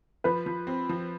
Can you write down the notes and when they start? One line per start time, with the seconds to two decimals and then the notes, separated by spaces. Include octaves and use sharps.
0.24 F3 B4
0.46 F3
0.67 C4
0.89 F3